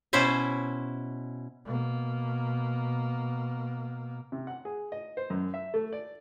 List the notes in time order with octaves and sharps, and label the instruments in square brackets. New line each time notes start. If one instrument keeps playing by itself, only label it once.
[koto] B2 C#4 E4 C5 E5
[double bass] B2 A#3
[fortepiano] C3
F#5
G#4
D#5
C5
F#2
E5
A3
D5